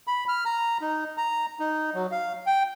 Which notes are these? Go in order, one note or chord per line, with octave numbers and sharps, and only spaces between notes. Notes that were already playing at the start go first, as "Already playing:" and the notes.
B5
F6
A#5
D#4
A#5
D#4
F#3
F5
G5